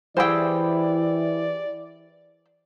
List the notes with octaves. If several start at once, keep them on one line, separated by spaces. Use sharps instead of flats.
E3 E4 G4 G#4 C5 D5 G5